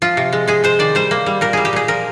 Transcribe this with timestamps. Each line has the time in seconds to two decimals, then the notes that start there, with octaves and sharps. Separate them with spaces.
0.02 F3 F4
0.17 C3
0.33 G#3
0.48 G#3 G#4
0.64 G#3 C5
0.79 D#3 D5
0.95 G3 C5
1.11 A#3
1.26 G3
1.41 A#2 A#4
1.53 G3 G#4
1.65 G4
1.73 A#2 G#4
1.88 F3 A#4